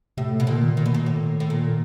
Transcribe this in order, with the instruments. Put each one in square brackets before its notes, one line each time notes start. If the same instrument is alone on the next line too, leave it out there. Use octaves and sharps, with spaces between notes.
[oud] A2 [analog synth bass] C3
[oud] B2
[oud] A#2 [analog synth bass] D3
[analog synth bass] D#3
[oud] A#2
B2
A#2
A2
A2
A#2